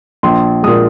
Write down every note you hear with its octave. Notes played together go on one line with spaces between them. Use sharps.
A#1 C6
A#2 G#3 D#6